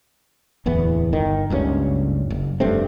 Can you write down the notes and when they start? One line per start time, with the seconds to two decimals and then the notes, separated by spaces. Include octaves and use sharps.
0.66 D1 E2 E3 B3
1.13 G1 D#3
1.50 F#1 C#2 G2 C#4
2.30 F#1
2.60 F1 G2 A3 C4